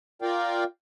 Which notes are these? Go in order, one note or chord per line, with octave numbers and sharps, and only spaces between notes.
F4 A#4 D5 F5 G5